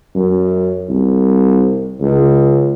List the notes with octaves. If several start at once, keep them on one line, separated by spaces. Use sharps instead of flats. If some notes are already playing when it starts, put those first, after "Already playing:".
F#2
C2
C#2